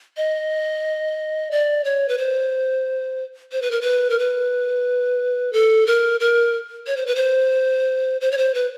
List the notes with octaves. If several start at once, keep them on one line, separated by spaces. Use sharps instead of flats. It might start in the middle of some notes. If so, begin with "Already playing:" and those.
D#5
D5
C#5
B4
C5
C5
B4
A#4
B4
A#4
B4
A4
A#4
A#4
C#5
C5
B4
C5
C5
C#5
C5
B4